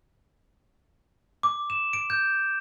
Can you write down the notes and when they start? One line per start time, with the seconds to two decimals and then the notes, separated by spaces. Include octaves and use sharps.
1.43 D6
1.70 E7
1.93 D7
2.10 G6